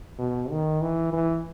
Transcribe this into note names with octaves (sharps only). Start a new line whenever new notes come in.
B2
D#3
E3
E3